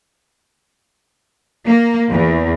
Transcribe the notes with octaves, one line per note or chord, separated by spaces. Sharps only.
A#3
E2